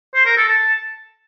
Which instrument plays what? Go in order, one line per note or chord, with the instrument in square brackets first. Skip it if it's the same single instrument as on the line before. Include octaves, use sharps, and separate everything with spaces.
[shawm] C5
A#4
A4
A5